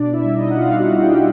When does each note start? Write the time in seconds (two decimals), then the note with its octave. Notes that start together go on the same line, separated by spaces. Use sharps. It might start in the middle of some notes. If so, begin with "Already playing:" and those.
Already playing: B2 D4 D5
0.13 E4 E5
0.24 G3
0.35 D#4 D#5
0.50 F#5
0.57 B2 F4 F5
0.79 F#4 F#5
0.91 G3
0.96 F#5
1.01 G4 G5